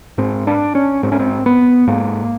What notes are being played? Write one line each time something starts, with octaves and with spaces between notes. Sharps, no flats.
G#2 C4
D4
C#4
G#2 C4
C#4
C4
B3
G#2 A#3